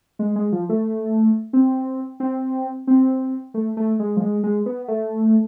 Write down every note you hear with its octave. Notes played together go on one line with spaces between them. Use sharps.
G#3
G#3
F3
A3
C4
C4
C4
A3
A3
G#3
F3
G#3
G#3
B3
A3